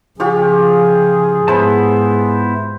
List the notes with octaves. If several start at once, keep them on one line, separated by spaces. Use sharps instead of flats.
C#3 F3 F4 G4 G#4 C#5
G#2 B3 E4 C5 A5 B5